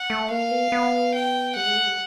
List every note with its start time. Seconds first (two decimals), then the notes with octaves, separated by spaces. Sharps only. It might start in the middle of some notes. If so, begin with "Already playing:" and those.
Already playing: F#5
0.10 A3
0.31 A#3 F5
0.51 B3
0.72 B3
1.14 G5
1.55 G3 F#5
1.66 G#3
1.76 A3
1.86 G3